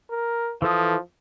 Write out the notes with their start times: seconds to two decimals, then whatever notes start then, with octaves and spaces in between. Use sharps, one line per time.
0.10 A#4
0.62 E3 F3 A4 D#6